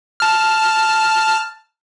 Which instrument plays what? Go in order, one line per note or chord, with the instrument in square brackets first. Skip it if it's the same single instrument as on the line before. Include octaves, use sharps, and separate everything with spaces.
[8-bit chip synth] A5 F6